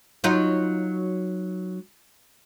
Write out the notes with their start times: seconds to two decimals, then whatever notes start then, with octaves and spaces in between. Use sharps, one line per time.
0.24 F#3 D#4 F4